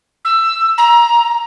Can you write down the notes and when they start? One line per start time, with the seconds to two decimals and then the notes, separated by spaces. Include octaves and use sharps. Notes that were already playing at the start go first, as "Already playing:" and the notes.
0.25 E6
0.78 A#5